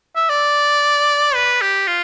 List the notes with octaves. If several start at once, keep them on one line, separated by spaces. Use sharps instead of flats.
E5
D5
B4
G4
F4